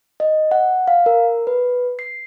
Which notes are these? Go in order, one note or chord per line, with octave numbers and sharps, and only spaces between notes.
D#5
F#5
F5
A#4
B4
C7